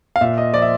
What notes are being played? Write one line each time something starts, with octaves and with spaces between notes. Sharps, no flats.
F5
A#2 E5
D#5
F3 D5
E5